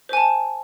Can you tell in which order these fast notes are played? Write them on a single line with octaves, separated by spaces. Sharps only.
C5 G#5 A5